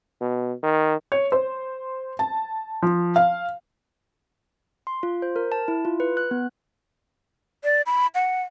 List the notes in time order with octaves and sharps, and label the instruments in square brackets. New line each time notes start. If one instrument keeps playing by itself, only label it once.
[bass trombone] B2
D#3
[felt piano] C#5
C5
A5
F3
F5
[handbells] C6
F4
C5
A#4
A5
E4
F4
B4
F#6
B3
[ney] D5
B5
F#5